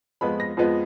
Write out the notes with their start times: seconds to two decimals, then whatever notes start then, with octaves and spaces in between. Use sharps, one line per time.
0.21 F2 F3 G#3 B3 B5
0.40 A#6
0.57 F2 F3 G#3 B3